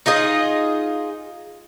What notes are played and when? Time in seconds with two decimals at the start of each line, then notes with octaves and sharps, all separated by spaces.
0.06 D#4 F4 G#4 D#5